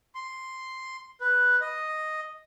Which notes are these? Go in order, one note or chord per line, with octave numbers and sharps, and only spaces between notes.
C6
B4
D#5